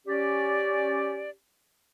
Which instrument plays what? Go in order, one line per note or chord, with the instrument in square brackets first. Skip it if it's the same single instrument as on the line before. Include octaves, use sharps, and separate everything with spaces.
[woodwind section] C#4 G4 D5